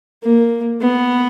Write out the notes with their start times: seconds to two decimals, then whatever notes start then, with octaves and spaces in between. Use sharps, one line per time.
0.23 A#3
0.80 B3